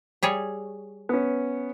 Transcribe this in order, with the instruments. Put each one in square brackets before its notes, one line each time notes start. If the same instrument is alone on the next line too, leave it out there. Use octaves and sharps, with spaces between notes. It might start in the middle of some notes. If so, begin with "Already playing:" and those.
[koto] G3 G#4 C#5
[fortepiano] B3 C#4